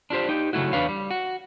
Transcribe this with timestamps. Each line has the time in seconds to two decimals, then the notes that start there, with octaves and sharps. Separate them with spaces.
0.10 D4 F4 G4 C5
0.29 D#4 G4
0.53 C#3 F#3 G#3 A3 E4 F#4
0.73 E2 D4 B4 C#5 F5
0.89 G3
1.11 F#4